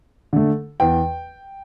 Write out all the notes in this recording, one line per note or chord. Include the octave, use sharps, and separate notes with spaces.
D3 A3
E2 G5